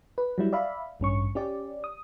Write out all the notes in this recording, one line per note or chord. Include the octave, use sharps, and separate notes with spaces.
B4
F#3 G3 E4
D5 E5 F5 B5
A1 G2 C#4 C#6
C#4 G4 D5
D#6